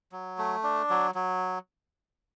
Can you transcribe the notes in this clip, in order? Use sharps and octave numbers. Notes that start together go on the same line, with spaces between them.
F#3
A3
D4
F#3
F#3